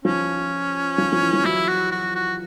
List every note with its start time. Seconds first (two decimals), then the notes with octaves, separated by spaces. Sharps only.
0.05 F3 C#4
0.98 F3
1.12 F3
1.22 E3
1.33 F3
1.45 F#3 E4
1.68 F#4
1.92 F#4
2.15 F#4